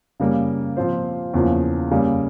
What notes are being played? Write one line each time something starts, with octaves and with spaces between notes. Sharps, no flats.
C#3 G3 A#3
A#2 F3 C4 F4 C5
E2 C#3 F3 A#3
C#3 G3 A#3